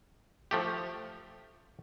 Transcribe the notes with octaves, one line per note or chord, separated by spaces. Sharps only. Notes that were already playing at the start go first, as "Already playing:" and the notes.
F3 A3 G4